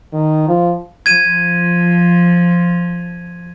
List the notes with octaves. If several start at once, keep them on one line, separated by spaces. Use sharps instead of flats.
D#3
F3
F3 G#6 D#7